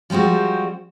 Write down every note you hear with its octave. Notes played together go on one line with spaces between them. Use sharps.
F3 G3 G#3 C4 F#4